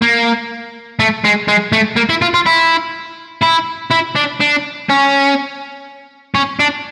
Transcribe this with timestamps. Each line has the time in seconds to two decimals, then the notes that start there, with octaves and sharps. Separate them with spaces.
0.02 A#3
1.00 A3
1.24 G#3
1.48 G#3
1.73 A3
1.97 A#3
2.10 E4
2.22 F4
2.34 F4
2.46 E4
3.43 E4
3.91 E4
4.16 D4
4.41 D4
4.89 C#4
6.35 C#4
6.59 D4